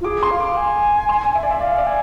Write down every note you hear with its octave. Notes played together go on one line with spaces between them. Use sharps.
F4
G#4 D6
C6
F5
D6
G#5
C6
E5
D5
E5
D5 F5
D5
G#5